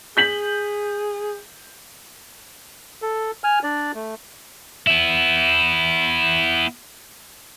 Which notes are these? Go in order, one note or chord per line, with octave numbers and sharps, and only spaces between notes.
G#4 G6 B6 F#7
A4
G#5 F6
D4 D5
A3
B3 E4